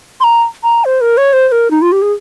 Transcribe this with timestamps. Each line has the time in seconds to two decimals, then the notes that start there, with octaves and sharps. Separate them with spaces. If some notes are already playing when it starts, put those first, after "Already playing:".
0.20 C6
0.24 A#5
0.63 A#5
0.85 C5
1.01 A#4
1.17 C#5
1.33 C5
1.49 C5
1.52 A#4
1.71 D#4
1.82 F4
1.92 G4
2.02 G#4